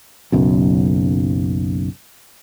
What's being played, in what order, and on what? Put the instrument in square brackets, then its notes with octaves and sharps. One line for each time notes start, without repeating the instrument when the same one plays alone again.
[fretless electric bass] F#1 B1 F#2